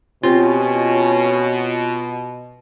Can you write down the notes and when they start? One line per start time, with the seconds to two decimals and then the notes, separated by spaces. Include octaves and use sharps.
0.23 B2 C4 C#4 F4 G4 C5